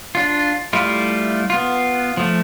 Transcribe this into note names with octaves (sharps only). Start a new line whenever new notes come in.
D4 F4
G3 A3 E4 F4
B3 F4
F3 A3